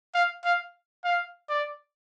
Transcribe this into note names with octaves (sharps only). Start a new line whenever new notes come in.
F5
F5
F5
D5